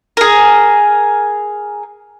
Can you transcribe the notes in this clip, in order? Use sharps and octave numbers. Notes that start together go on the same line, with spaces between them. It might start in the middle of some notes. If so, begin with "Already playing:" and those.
G#4 A#4